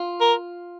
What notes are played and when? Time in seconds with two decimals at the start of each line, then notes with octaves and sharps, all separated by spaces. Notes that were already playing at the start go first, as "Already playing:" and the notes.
Already playing: F4
0.21 A#4